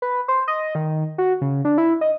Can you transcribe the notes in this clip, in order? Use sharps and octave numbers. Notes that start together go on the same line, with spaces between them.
B4
C5
D#5
D#3
F#4
C#3
D4
E4
D#5